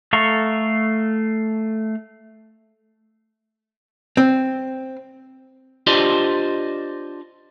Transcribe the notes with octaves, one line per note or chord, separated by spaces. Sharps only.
A3 A4 F5 A#5 C#6
C4
D4 F4 G4 C5 D5 D#5